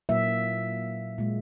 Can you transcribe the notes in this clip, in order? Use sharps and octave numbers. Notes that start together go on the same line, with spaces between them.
A#2 F#3 A#3 E5
A#2 G#3